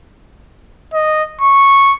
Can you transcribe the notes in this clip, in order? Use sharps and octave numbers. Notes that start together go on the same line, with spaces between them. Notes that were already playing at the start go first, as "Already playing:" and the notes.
D#5
C#6